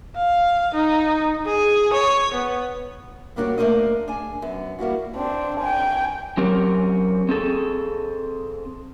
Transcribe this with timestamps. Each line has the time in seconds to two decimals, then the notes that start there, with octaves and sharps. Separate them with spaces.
0.16 F5
0.74 D#4
1.46 G#4
1.93 C#5
2.34 B3
3.36 G3 A#3 D4 F4 F#4 C#5
3.58 A3 A#3 D4 A#4 C5 D#5
4.08 D4 G#4 G#5
4.42 F#2 B3
4.79 G3 A#3 E4 F#4
5.16 C4 D4
5.61 G5 G#5
6.37 F#3 C4 C#4 G4 A#4
7.29 C4 G#4 A4